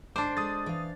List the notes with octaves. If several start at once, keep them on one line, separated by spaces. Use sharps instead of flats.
G#2 D3 D4 C5 D6
G#3 D#6 A6
E3 F5